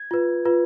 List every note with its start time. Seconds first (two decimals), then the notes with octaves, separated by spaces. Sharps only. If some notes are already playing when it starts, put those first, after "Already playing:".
Already playing: G#6
0.11 F4 B4
0.45 F4 B4